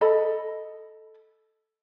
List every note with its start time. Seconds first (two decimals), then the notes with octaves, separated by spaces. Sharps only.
0.01 A4 D#5 B5